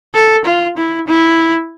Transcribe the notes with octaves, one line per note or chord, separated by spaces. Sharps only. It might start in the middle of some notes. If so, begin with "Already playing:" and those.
A4
F4
E4
E4